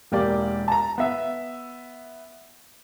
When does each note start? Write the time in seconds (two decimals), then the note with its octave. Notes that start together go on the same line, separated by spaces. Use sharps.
0.12 E1 A#3 G4 D5 D6
0.68 A5 A#5
0.98 B3 E5